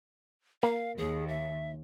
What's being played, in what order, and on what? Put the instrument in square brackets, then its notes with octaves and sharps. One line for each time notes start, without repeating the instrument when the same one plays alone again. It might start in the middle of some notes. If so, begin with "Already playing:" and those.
[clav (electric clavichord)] A#3 [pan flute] F5
[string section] D#2 [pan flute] G#4
[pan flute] E5